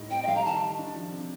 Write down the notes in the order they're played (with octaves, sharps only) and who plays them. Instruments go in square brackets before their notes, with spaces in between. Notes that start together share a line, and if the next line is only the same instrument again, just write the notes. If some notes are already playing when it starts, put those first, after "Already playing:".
Already playing: [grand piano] A2 G3 D#4
[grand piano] C4 [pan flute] G5
[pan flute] D#5
[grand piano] G3 [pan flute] F5
[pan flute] A#5
[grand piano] D#3 [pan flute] A5
[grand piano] D#3
D4
F3
C3